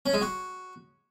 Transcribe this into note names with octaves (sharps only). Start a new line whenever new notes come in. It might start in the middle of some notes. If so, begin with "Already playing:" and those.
C#4
G#3
F#4